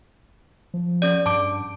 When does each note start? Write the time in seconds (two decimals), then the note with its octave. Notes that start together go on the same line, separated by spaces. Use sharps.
0.74 F3
1.02 C#4 G#4 D5
1.26 G2 A5 D6 D7